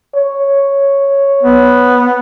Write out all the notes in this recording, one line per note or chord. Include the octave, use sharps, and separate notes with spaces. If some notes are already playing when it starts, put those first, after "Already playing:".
C#5
B3